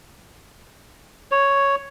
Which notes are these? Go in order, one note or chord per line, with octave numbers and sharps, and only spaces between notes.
C#5